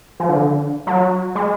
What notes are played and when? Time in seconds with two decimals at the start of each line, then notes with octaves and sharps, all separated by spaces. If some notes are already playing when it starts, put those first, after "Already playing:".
0.20 F3
0.29 D3
0.87 F#3
1.35 G#3